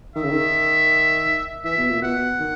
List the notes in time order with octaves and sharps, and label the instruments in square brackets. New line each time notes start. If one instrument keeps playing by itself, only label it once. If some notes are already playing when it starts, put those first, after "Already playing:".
[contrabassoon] D#3 [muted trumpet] E5
[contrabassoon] C#3
D#3
[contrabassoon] E3 [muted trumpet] E5
[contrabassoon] B2
A#2
[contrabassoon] B2 [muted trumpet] F#5
[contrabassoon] D#3